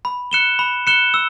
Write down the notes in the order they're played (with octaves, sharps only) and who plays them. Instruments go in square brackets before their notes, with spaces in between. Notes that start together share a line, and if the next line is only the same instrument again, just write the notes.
[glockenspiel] B5
F#6 C#7 E7 G7
B5
F#6 C#7 E7 G7
E6